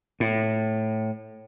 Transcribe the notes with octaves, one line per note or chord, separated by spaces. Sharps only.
A2